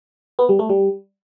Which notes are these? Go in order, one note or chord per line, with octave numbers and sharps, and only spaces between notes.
B3
G3
A3
G3